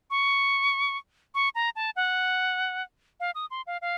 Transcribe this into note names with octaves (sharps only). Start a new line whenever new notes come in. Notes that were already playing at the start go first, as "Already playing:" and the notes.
C#6
C#6
A#5
A5
F#5
F5
D#6
C6
F5
F5